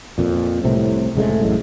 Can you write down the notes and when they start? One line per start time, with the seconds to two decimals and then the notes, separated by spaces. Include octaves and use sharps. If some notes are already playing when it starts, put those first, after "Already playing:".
0.18 F2 A#2
0.64 C2 A2 C3
1.15 F1 C#3 G#3 A3
1.41 A1 F#2 A2